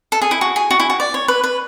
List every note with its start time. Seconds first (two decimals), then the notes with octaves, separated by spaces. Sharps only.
0.12 A4
0.22 G#4
0.31 E4
0.41 F#4
0.56 G#4
0.71 F#4
0.80 E4
0.90 F#4
1.00 D5
1.14 C#5
1.28 B4
1.44 B4